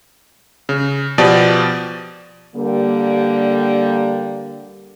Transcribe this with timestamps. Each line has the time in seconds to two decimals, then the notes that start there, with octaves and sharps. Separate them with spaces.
0.69 C#3
1.18 B2 F3 G4 D5
2.56 D3 G3 A#3